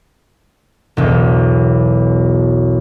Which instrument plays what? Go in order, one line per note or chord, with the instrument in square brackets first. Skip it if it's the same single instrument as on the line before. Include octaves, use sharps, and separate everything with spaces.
[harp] E1 B1